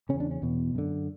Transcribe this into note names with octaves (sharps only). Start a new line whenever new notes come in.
E2 C#3 C#4
D4
C#4
E2 B2
F#2 D3